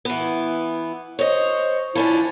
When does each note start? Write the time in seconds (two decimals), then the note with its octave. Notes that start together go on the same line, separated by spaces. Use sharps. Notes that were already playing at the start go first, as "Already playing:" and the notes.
0.05 E3 B3
1.19 C5 C#5 D#5
1.95 F3 C#4 D4 E4